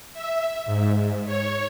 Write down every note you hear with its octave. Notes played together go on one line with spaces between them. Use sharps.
E5
G#2
C#5